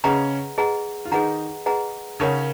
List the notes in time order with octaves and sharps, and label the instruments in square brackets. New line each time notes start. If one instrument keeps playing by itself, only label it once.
[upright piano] C#3 C#4 [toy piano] G#4 B4 D#5 F#5 A#5
[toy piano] G#4 B4 D#5 F#5 A#5
[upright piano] F4
[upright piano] D#3 D#4 [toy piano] G#4 B4 D#5 F#5 A#5
[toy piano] G#4 B4 D#5 F#5 A#5
[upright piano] C#3 C#4 [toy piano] D#4 A#4 C#5 F#5